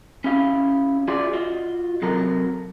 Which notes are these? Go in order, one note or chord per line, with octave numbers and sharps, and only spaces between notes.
C#4 E4 G4 F5
F4 F#4 G#4 D5 E5 C6
F4 F#4 D#5
C3 F#3 A4 A#4